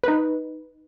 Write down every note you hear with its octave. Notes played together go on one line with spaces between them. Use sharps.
D#4 B4